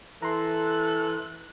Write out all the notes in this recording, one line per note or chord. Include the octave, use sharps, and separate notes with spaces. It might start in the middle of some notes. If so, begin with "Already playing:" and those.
E3 A4 A#5 C6 F#6